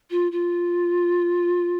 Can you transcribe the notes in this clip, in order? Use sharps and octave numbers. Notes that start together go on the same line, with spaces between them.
F4
F4